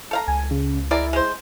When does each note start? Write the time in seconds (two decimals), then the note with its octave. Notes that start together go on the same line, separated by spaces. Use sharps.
0.11 A4 F5 A#5
0.28 C#2 G#5
0.51 C#3
0.91 G#3 E4 A#4 D5
1.13 G#3 C5